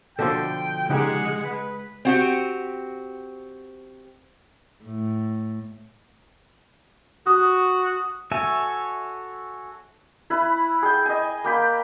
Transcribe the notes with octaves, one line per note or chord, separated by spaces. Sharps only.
B2 D3 F3 A4 C5 G5
C#3 G#3 D#4 G4 F#5
B4
C4 F#4 G4
A2
F#4 D#6
F#4 A4 C#5 E5 G#5
E4 B4 B5
G#4 G5
D#5 G#5
A#3 G5 B5